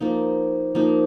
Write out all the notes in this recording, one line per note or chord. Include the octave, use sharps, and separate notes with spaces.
F3 A#3 D#4
F3 A#3 D#4